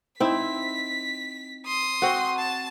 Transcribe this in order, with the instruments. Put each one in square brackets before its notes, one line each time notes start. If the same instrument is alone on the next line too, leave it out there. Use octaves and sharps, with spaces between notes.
[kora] C4 D#4 E4 [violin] B6
[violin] C6 D#6
[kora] C4 F#4
[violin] A5